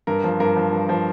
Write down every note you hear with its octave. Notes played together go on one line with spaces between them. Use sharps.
G2 A#4
F3
G2 A#4
F3
G2
F3